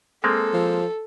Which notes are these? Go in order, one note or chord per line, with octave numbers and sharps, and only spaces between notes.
G#3 A#3 C4 A4
F3